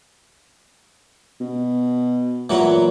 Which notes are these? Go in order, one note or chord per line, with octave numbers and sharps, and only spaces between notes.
B2
A#2 E3 F#3 A#4